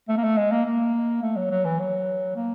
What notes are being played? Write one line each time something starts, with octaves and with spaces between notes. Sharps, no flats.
A3
A#3
A3
G#3
A#3
A#3
A3
F#3
F#3
E3
F#3
A#3